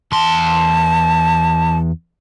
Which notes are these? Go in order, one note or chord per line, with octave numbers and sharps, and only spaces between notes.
E2 A5 C6